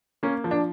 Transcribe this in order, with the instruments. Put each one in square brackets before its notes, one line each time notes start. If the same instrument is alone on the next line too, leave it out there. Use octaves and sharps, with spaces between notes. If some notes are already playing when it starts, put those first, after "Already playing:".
[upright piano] A#3 C#4
F3
D4